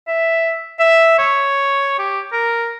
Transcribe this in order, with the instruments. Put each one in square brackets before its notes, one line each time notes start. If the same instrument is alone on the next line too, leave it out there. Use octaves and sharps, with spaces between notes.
[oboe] E5
E5
C#5
G4
A#4